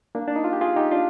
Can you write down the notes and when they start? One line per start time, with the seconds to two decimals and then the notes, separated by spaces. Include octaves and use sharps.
0.15 A#3 D4
0.28 D4
0.36 D#4
0.44 F4
0.53 G4
0.61 F4 G#4
0.76 D#4 G4
0.92 D4 F4